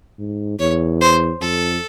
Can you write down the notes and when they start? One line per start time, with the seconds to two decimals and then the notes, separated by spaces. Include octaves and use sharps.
0.19 G#2
0.59 E2 C#5
1.01 C5
1.41 F2 A4